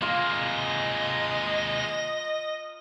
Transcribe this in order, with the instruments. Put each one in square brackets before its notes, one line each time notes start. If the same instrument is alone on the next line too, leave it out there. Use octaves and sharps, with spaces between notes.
[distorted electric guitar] G#3 A#3 [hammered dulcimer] F4 A#5 [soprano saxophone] D#5